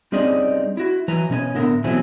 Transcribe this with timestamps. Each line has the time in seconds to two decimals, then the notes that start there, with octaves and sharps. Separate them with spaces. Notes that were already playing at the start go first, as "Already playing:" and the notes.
0.12 G3 C4 C#4 D#4 G#4 D5
0.77 E4 F#4
1.08 E3 F#3 B4 G#5 A#5
1.30 B2 C#4 A#4 G#5
1.55 A2 D3 B3 A#4
1.84 B2 E3 F#3 A3 C4 G#5